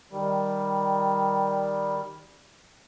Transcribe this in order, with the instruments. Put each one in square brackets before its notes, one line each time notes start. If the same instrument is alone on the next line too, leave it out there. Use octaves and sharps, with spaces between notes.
[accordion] D#3 G3